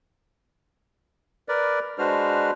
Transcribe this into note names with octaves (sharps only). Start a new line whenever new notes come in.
A#4 B4 D5
G#3 D4 F#4 B4 C5 F6